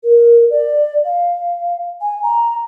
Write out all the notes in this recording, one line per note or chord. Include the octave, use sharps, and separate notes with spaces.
A#4
D5
F5
G#5
A#5